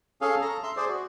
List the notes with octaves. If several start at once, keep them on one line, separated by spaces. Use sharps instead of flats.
C#4 G#4 A4 F5
A4 A#5
E5 C6
G#4 C5 D5
F#4